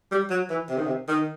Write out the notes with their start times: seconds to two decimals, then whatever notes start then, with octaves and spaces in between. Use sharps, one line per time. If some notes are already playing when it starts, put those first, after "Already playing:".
0.11 G3
0.30 F#3
0.50 E3
0.69 C3
0.77 D#3
0.86 C3
1.08 D#3